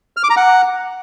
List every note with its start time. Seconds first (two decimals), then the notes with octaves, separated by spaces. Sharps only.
0.17 F6
0.23 D6
0.30 A#5
0.37 F#5